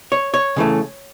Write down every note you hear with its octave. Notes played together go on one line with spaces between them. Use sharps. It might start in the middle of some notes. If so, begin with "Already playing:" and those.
C#5
C#5
C#3 E3 A3